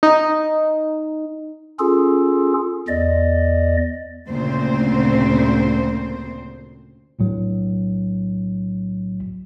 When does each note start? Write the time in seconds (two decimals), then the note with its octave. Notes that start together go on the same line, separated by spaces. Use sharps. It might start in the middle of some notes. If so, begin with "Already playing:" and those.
0.03 D#4
1.79 C#4 F4 G#4 A4
2.88 E2 D5 D#5
4.28 D2 A#2 C#3 C4 C5
7.19 B1 A2 F#3